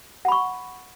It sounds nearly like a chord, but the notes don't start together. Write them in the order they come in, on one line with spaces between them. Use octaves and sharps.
F#5 B5 C#6